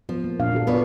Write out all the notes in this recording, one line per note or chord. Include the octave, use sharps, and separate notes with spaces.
F3 B3
A#3
A#2 D4 F5
D4 F#4 A4
B3 D4 F4 B4 C#5 D5